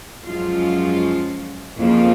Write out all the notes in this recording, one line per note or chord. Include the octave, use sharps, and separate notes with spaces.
F#2 F3 G#3 C#4 F4
F2 C#3 F3 A#3 F4